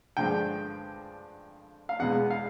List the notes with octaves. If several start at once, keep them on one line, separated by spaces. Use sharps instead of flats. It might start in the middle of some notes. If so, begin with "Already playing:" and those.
G2 D3 F3 G#3 G5
F5
E2 B2 G#3 F#5
F5